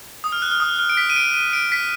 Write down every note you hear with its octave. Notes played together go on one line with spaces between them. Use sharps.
D#6
F6
F#6
F6
D#6
F6
D7
B6
D#7
D7
D#7
D7
B6